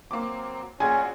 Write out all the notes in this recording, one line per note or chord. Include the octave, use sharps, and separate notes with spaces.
F#3 A#3 C4 D6
A#1 A#2 F#3 C#4 F4 G#4 F#5 G#5